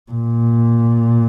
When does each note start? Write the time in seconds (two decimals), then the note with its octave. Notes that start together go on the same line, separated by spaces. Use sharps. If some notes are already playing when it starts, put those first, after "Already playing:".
0.12 A#2